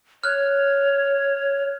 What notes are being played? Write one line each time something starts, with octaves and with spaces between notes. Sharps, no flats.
C#5 F6 F#6